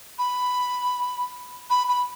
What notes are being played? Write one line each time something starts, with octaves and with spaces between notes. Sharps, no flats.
B5
B5
B5